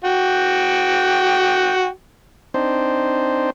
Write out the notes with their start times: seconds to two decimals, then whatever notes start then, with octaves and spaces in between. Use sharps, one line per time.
0.05 F#4 G5
2.54 C4 D4 D#4 C5